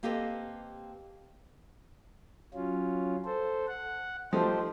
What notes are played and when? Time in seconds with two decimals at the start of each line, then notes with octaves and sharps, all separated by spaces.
0.03 A#3 C4 G4 A4 B4 D#5
2.54 F#3 C#4 F4
3.25 A4 C5
3.68 F#5
4.33 F3 A3 D#4 G4 C5